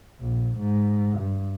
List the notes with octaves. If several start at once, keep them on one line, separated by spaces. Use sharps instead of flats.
A#1
G#2
G2